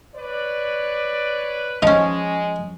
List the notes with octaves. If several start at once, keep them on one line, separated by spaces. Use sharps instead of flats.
B4 C#5 D5
F3 G#3 C#4 D#4 D#5